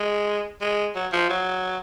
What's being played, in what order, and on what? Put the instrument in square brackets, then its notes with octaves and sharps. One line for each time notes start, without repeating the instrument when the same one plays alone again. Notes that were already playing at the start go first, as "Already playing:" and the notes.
Already playing: [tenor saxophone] G#3
G#3
F#3
F3
F#3